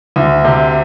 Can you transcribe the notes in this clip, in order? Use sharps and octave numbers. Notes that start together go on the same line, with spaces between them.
D2
C3